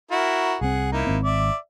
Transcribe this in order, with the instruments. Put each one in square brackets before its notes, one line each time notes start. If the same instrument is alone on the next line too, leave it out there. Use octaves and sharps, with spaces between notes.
[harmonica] E4 F#4 A#4
[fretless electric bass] C2 C4 [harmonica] G#4 F#5
[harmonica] A#3 D#4 E4
[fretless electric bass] G#1 C4
[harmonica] D5 E5